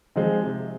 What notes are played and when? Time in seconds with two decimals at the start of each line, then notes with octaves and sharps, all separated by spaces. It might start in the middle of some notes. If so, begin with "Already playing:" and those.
0.16 F3 G#3 C4 D#4
0.43 C3